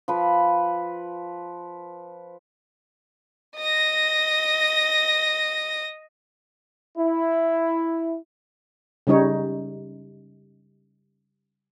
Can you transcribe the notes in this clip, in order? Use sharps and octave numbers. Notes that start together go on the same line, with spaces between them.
F3 B4
D#5 A#6
E4
C#3 G3 D#4 C#5